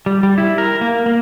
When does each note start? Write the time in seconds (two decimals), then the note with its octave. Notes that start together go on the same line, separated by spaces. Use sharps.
0.06 G3
0.23 G3
0.38 E4
0.58 A#4
0.81 A#3
1.06 A#3